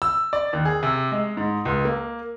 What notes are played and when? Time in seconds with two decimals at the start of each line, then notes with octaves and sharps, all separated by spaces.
0.02 E6
0.33 D5
0.53 D#2
0.65 G#4
0.83 C3
1.12 G#3
1.37 G#2
1.65 C#2
1.85 A#3